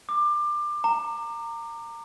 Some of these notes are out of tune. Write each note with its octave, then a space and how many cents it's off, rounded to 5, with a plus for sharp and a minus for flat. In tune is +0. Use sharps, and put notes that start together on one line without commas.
D6 +25
A#5 -20